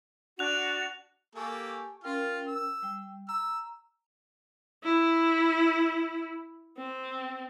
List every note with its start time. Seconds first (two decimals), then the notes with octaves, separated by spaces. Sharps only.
0.39 D4 F#4 F#6 F7
1.36 A#3 G4 A4 G#5 A5 C#6
2.04 C#4 F4 A#4 G5 F6
2.47 E6
2.82 G3 G5
3.29 A#5 E6
4.84 E4
6.78 C4